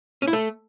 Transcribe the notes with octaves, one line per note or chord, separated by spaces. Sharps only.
C#4
E4
A3